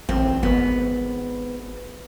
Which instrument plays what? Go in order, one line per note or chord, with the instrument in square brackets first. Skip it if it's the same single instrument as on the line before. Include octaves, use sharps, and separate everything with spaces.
[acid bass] A1 [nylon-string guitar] C4
[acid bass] G#1 [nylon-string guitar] B3